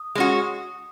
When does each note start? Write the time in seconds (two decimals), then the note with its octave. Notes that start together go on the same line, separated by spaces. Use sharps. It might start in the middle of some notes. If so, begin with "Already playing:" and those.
Already playing: D#6
0.15 G#3 C#4 F#4